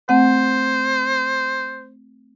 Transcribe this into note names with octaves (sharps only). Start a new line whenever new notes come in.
A3 C4 C5 F#5